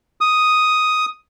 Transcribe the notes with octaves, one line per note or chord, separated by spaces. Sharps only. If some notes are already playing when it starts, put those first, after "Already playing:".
D#6